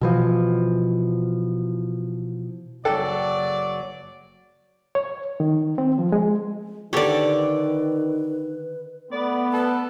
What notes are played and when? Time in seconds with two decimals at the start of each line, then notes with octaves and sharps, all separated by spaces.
0.01 B2 E3 F3
2.85 F#1 F#3 A4 D5 G5
4.95 C#5
5.40 D#3
5.78 C4
5.99 F3
6.12 G#3
6.93 D3 D#3 G4 A4 B4 C#5 D5
9.12 A3 B3 D5
9.53 A4 B4